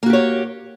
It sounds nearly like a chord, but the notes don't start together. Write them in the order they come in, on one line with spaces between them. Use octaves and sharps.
A#3 F#4 G4 C#5